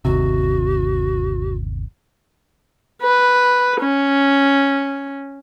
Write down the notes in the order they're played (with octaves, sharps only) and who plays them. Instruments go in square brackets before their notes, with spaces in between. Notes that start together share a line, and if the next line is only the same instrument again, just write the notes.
[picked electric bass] G1 D#2 C3 [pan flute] F#4
[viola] B4
C#4